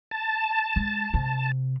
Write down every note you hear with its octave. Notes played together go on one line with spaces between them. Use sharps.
A5
G#3
C3